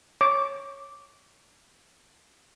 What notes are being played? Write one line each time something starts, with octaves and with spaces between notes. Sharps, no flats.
C#5 D6